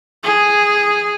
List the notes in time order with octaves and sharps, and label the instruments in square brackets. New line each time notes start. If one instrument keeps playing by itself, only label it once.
[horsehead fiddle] G#4